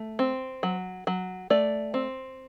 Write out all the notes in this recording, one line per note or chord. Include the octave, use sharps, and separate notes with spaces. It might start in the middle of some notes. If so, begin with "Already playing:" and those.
Already playing: A3
C4
F#3
F#3
A3 D5
C4